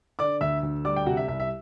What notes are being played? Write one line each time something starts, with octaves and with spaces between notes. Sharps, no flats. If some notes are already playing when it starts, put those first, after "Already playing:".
D3 D5 D6
D2 E5 E6
D2
G3 D5 D6
G5
C3 F#4 F#5
E5
C2 E5
E5